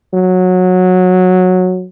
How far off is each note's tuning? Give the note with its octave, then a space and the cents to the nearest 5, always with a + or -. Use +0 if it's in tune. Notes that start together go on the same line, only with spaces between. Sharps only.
F#3 -15